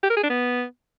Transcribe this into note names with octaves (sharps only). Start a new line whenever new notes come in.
G4
A#4
G#4
D4
B3